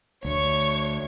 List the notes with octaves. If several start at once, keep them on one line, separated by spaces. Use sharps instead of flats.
D2 C#5 C#6